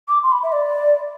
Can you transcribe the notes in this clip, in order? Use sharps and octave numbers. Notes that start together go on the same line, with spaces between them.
D6
C6
B5
E5
D5